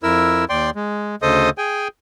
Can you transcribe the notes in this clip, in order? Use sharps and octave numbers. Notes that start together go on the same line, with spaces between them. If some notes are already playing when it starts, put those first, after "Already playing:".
F2 E4 A#4 E6
D#2 D5 G5 C6
G#3
D2 C#3 A4 C5 D#5 D#6
G#4 G5 G#5